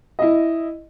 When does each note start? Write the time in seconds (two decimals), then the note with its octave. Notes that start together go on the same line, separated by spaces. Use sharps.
0.19 E4 D#5